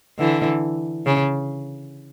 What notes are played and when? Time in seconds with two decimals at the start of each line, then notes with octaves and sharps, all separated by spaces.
0.19 D3 E3
1.06 C#3